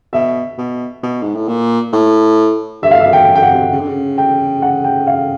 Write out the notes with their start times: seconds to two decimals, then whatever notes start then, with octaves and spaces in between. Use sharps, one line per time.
0.13 B2 E5
0.58 B2
1.03 B2
1.22 G#2
1.35 A2
1.48 A#2
1.93 A2
2.82 G2 E5
2.91 F5
3.00 E5
3.05 F#2
3.13 G5
3.28 F#2
3.35 G5
3.42 F#5
3.50 C3
3.72 C#3
3.80 D3
3.88 C#3
4.18 G5
4.62 F#5
4.84 G5
5.07 F5